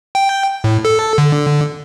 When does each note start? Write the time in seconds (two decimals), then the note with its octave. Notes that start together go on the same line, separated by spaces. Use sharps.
0.15 G5
0.64 A2
0.85 A4
1.18 D3